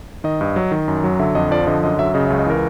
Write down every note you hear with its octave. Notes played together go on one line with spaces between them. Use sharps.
D#3 D#5
G2
F#3
D#3
F#2
F#3
D3 E5
F2 D#5
F3 D5
D3 D#5
F#2 D#5
F#3 E5
C#3 D#5
E5
C#2
D#5
E3 A#4